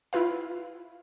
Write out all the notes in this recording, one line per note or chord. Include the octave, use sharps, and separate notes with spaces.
E4 F4 B4 F5